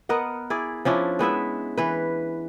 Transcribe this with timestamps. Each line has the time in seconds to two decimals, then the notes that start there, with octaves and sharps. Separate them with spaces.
0.09 B3 A#4 D#5 F#5
0.50 E4 G#4 D5
0.85 F3 C#4 D4 E4
1.19 G#3 B3 E4 E5
1.77 E3 B4